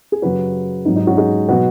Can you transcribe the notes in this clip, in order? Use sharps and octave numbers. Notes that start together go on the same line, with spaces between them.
G#4
F#2 C#3 F#3 F#4 B4
G#2 F#3 D#4
D#4
C#4 F#4
D#4 G#4
B2 F#3 F#4 B4